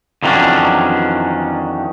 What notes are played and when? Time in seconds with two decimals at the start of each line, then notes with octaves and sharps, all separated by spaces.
0.23 F2 D#3 E3 F#3 C#4 D4